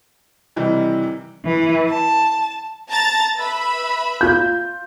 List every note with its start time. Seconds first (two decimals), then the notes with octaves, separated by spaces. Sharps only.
0.56 C3 D#3 E3 G3
1.45 E3
1.88 A5
2.88 A5 A#5 A6
3.37 B4 E5 B5
4.21 F4 G6